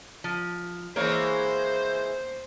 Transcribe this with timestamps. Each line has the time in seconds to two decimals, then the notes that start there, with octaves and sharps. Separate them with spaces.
0.24 F3
0.96 E3 G#3 A#3 A#4 C5 C#5 F5